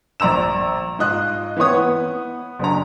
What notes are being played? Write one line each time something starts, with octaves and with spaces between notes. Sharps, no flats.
A#1 D5 A#5 E6 E7
G#2 F4 D#5 F#6
E3 B3 C4 C#5 D#6
B3
F#1 D4 A#5